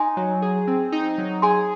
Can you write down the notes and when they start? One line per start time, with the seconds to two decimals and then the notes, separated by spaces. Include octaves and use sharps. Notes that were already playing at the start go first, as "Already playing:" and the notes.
Already playing: D#4 G#5 C6
0.17 F#3
0.42 G#4
0.67 C4
0.92 D#4
1.18 F#3
1.42 G#4 G#5 C6